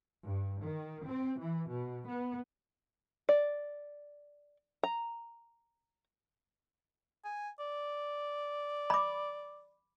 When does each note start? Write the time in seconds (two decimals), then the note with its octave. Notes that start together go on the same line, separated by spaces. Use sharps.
0.25 G2
0.63 D#3
1.07 C4
1.41 E3
1.71 B2
2.09 B3
3.29 D5
4.83 A#5
7.25 G#5
7.60 D5
8.90 B5 D6